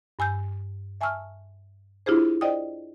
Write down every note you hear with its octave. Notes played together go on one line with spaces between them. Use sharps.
G2 G#5 E6 G6
E5 G#5 A5 C#6 E6 F6
D4 E4 F4 G4 G#4 C5
C5 D5 D#5 G5 D#6